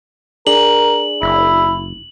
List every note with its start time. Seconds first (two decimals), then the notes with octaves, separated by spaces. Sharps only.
0.47 D4 G#4 A#4 D5 F#7
1.22 F#1 E4